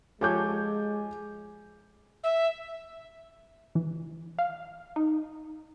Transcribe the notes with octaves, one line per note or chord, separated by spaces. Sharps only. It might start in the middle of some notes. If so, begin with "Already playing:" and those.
F3 G#3 G4 A4 C#5 G#5 D6 G6
E5
E3
F5
D#4